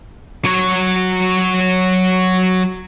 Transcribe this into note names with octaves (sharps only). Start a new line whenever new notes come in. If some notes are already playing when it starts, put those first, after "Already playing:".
F#3 C#5